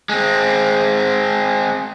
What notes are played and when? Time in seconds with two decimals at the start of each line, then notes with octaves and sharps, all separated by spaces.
0.09 G#3 C4